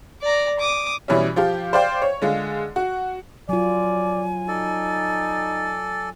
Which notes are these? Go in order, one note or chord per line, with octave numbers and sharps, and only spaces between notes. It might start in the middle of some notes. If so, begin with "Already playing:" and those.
D5 A#5
D6 D#6
B2 E3 G3 C#4
F3 F4 G4
C5 D5 F5 G5
C#5
D3 G#3 F4
F#4
F#3 F4 D5 G#5
D#4 A4 D5